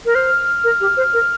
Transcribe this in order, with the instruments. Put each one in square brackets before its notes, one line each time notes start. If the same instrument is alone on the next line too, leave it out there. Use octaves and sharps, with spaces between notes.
[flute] A#4
[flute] C5 [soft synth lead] F6
[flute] A#4
G4
C5
A#4